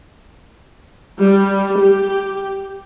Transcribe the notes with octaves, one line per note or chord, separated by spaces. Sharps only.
G3
G4